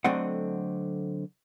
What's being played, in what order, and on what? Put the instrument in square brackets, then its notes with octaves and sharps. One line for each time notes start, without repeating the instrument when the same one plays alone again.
[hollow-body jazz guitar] D3 F#3 A3 C4 D#5 F#5